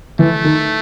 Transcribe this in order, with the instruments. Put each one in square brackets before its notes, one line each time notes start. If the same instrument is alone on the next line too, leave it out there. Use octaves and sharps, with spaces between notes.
[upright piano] E3 [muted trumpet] A3
[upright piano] D#3